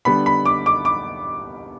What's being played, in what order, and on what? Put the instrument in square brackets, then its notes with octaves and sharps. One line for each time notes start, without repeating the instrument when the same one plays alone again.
[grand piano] D3 G3 B3 B5
B5
D6
D6
D6